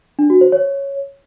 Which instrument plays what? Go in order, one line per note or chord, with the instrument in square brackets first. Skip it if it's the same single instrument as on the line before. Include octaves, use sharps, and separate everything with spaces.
[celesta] D4
F#4
C5
C#5